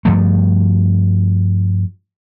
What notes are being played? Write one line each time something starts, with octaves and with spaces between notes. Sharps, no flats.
G2 F3 A3